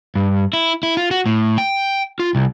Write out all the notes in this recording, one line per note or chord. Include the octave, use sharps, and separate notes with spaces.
G2
E4
E4
F4
F#4
A2
G5
F4
C2